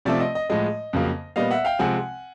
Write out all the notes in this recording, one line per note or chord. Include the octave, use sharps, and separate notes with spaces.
C3 F3 A3 C4 D5 E5
D#5
D#5
A2 F3 G#3 D#5
F2 C#3 F#3 A#3
A#2 G3 B3 D#5 F5
E5 F#5
F5 G5
C3 F3 G#3 C4 F#5 G#5